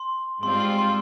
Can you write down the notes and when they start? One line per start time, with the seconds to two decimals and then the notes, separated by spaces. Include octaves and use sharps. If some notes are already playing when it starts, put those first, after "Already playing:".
Already playing: C6
0.43 G#2 G3 C4 F4 C6
0.60 C6
0.78 C6